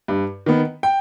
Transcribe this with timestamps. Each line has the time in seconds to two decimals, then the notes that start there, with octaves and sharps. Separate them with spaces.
0.08 G2
0.46 D#3 B3
0.83 G5